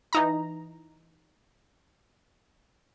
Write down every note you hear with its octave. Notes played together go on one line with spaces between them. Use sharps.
E3 D#4 A#5